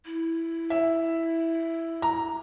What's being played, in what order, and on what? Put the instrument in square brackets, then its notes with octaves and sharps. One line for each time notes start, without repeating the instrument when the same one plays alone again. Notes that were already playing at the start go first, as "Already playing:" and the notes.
[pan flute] E4
[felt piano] E5
A#5